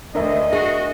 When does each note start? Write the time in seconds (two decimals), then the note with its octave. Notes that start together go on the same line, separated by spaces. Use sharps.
0.15 D2 D4 A#4 D#5 E5
0.53 F#4 G#4